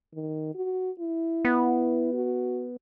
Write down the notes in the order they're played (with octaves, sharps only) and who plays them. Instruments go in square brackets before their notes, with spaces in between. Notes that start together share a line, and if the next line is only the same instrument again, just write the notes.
[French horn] D#3
F#4
E4
[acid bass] B3
[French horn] F#4